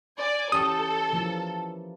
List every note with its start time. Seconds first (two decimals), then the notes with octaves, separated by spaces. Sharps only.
0.18 D5 G#5
0.52 E3 C#4 G4 A4 D#6
1.13 E3 F3 A#3